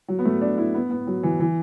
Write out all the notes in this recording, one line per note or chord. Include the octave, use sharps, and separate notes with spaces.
F#3
B3
A3
D4
E4
B3
B3
F#3
E3
E3